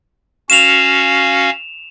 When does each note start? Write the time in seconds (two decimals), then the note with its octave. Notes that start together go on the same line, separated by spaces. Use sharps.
0.50 C#4 F#4 F5 E7 F7